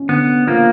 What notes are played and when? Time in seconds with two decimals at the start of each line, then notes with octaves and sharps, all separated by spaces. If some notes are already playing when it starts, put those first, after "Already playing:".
Already playing: C#4
0.09 D3 B3
0.47 F3 A#3